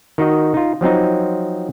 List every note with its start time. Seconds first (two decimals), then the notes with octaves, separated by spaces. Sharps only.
0.18 D#3 D#4 F#4 D#5
0.54 D#4 F4
0.81 F3 F#3 C4 D#4